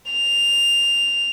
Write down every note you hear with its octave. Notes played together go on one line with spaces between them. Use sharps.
F7